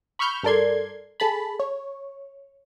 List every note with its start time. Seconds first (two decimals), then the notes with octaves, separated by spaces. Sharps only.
0.19 B5 C#6 E6 F6 G6
0.43 G2 A4 A#4 D5 C6 G#6
1.20 G#4 A4 A5 B5
1.59 C#5